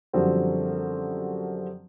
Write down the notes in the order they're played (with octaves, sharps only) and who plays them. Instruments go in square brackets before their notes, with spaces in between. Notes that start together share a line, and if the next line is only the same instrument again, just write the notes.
[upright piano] F#2 D3 F3 G3 C4 F#4